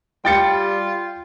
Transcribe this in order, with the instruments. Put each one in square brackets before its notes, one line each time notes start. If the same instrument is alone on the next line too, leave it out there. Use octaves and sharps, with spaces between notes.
[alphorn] G3 [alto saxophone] F4 [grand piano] G5 A6 C#7